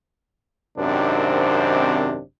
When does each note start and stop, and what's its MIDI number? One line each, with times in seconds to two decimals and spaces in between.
0.77 2.21 32
0.77 2.21 42
0.77 2.21 48
0.77 2.21 51
0.77 2.21 60
0.77 2.21 62